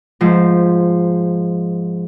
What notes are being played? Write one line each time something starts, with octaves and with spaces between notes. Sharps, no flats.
G#2 F3